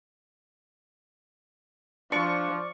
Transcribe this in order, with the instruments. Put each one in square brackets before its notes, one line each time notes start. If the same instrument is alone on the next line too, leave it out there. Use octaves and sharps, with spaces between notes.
[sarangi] F3 [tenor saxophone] D4 [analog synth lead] D5 [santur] C#6